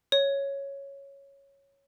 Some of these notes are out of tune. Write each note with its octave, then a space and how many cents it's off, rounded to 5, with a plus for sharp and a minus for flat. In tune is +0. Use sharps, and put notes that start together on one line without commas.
C#5 -5